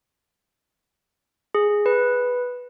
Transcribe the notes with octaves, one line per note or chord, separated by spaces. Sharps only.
G#4
B4